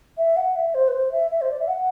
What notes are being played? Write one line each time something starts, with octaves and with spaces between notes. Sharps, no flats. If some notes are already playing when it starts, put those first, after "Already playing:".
E5
F#5
E5
C5
B4
C5
E5
E5
C5
D5
E5
F#5